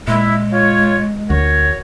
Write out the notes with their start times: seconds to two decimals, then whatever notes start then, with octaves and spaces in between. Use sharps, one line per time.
0.07 A#2 G#3 E4
0.53 F4 C#5
1.30 D2 F#4 A#4 C#5